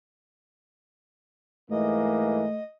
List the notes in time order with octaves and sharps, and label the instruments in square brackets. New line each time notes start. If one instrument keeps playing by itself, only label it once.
[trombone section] G#2 E3 A#3 [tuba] A3 [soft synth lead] D#5